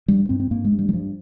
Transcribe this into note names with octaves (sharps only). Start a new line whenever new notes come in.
G2 G3
G2 C4
C4
G2 A#3
G#3
G2
G3
G3
G2 F3